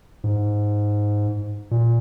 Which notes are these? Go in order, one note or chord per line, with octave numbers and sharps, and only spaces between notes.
G#2
A#2